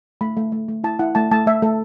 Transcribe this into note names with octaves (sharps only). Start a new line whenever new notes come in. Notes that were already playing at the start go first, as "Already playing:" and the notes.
A3 B5
A3
A3
A3
E4 A5
E4 F#5
A3 A5
A3 A5
A3 E5
A3 A4